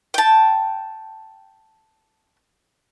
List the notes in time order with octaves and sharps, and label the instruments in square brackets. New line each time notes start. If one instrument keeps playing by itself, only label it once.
[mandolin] G5 A5